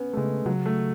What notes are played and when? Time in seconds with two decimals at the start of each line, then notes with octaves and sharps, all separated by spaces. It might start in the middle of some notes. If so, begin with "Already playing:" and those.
Already playing: B3 C#4
0.13 A3
0.17 C#3 G#3
0.46 C#3 F#3
0.66 A3